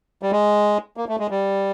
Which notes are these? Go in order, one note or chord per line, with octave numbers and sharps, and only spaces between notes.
G3
G#3
A#3
A3
G#3
G3